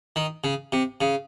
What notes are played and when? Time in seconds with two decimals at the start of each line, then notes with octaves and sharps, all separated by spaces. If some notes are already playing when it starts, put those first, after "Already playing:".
0.16 D#3
0.44 C#3
0.72 C3
1.01 C#3